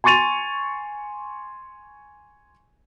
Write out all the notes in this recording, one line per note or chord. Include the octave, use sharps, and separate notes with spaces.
G#5 C6 C#6 A6 D#7 F7